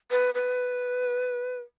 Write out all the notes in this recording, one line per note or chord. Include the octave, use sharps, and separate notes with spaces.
B4
B4